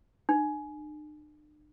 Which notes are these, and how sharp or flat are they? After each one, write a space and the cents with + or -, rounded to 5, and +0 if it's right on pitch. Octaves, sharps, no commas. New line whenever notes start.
D4 +45